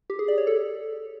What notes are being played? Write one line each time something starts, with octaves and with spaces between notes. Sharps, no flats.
G4
G#4
D5
C#5
A4